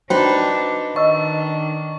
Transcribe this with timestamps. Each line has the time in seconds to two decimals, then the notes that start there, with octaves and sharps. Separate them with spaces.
0.10 D4 D#4 F#4 B4 C5 G5
0.96 D#3 D4 D#5 C#6 E6